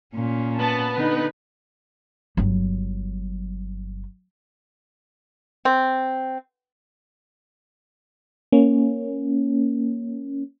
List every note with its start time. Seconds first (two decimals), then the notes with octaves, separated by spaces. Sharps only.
0.14 A#2 C#4
0.59 B3 A5
0.95 D3 D#4 B4
2.37 G1 F#3
5.65 C4
8.52 A#3 C#4